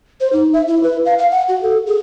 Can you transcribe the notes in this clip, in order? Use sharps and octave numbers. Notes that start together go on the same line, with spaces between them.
C5
D#4
E5
E4
B4
F5
F5
F#5
F#4
A4
G#4